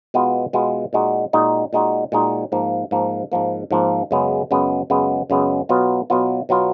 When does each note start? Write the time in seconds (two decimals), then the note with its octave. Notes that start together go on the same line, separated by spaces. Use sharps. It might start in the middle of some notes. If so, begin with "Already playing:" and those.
0.14 B2 G#3 B3 F4
0.53 B2 G#3 B3 F4
0.93 A#2 G#3 D#4 F#4
1.33 A#2 G#3 D#4 F#4
1.73 A#2 G#3 D#4 F#4
2.12 A#2 G#3 D#4 F#4
2.52 G#2 F3 A#3
2.91 G#2 F3 A#3
3.32 G#2 F3 A#3
3.71 G#2 F3 A#3
4.11 F#2 C#3 G#3 B3
4.51 F#2 C#3 G#3 B3
4.90 F#2 C#3 G#3 B3
5.30 F#2 C#3 G#3 B3
5.69 B2 F#3 B3 F4
6.10 B2 F#3 B3 F4
6.49 B2 F#3 B3 F4